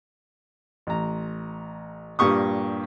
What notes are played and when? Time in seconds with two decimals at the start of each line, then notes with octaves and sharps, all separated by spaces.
0.87 A1 A#5
2.19 G2 A#2 G4 C#6 D#6